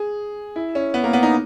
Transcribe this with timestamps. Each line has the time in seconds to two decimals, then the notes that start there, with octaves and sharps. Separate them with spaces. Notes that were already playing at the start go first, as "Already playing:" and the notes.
Already playing: G#4
0.56 E4
0.75 C#4
0.94 B3
1.04 A#3
1.13 B3
1.23 D#4